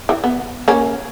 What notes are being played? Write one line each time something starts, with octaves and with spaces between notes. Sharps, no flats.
E3
B3
A#3 C#4